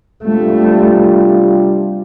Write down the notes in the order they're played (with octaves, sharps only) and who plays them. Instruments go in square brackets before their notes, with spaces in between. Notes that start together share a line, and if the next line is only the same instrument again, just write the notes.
[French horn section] C3 G3 D4 F4 [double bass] A3